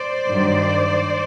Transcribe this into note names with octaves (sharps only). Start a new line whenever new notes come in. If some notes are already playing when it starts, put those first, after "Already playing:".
Already playing: C5 D5
G2 D#3 F#3